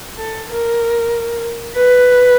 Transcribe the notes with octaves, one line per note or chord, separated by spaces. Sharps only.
A4
A#4
B4